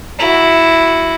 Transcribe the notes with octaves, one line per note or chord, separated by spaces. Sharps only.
E4 F#4